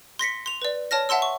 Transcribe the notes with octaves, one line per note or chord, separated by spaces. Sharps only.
C6 A#6 B6 C#7
C6 F7
B4 D5
C#5 A5 F6 A#6
E5 F#5 A5 C6 E6
C#6